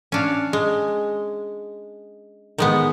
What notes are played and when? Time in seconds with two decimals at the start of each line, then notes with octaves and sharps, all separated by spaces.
0.12 C#4 D4 F5
0.53 G#3
2.58 D#3 G#3 B3